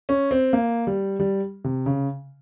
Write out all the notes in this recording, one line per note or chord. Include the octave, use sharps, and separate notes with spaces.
C#4
C4
A#3
G3
G3
C3
C#3